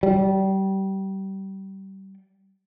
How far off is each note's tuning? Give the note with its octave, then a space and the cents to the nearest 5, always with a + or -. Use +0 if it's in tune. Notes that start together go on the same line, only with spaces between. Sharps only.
G3 -25